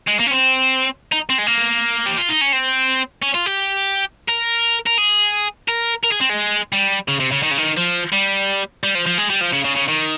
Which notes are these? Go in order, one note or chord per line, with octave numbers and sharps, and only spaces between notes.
G#3
A#3
C#4
C4
D#4
C4
G#3
A#3
G4
F4
D#4
C#4
C4
C#4
F4
G4
A#4
A#4
G#4
A#4
A#4
G#4
C4
G#3
G3
C#3
C3
C#3
D#3
C#3
D#3
F3
G3
G3
F3
F3
G#3
G3
F3
C#3
C#3
C#3
D#3